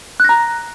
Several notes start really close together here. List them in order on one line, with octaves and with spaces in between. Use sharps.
F#6 A#6 A#5